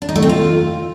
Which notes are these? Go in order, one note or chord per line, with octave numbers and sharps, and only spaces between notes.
D4
D#4
A3
C4
F4